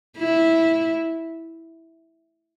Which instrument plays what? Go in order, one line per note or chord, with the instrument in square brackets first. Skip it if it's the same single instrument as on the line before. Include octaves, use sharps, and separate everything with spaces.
[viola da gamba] E4